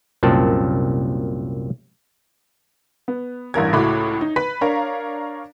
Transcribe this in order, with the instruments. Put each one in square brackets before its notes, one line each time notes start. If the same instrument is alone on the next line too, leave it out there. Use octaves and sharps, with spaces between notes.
[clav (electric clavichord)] C2 F#2 A#2 C4 A5
[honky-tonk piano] B3
A1 G2 A#4 G#6
C#2 A2 A3 F#4 B5 D6
D#4
B4 B5 B6
D4 A#4 C#5 F5 A#5